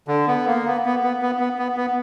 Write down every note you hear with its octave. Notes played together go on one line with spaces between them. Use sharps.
D3
B3
A#3
B3
B3
B3
B3
B3
B3
B3